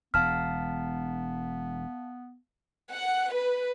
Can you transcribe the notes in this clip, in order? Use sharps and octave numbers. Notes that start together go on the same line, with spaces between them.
E1 E2 B3 F5 A5 F6 B6
F#5
B4